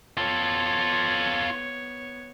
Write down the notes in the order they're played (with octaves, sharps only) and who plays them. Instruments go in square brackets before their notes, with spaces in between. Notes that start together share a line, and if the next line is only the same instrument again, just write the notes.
[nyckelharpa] B3 C#5 [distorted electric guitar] F4 A4